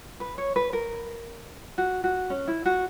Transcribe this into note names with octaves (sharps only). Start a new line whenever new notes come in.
B4
C#5
B4
A#4
F#4
F#4
C#4
E4
F#4